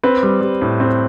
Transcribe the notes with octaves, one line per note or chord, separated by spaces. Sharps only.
C4 B4
G3
G3
A2
C4